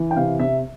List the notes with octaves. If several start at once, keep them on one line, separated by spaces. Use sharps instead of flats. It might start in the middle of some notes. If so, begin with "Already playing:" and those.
Already playing: E3
G5
C3 F5
C3 E5